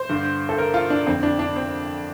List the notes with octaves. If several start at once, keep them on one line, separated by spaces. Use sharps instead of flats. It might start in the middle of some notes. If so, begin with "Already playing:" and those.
Already playing: C5
G2 D3
A4
A#4
F4
D4
F2 D3 C4
D4
D4
C4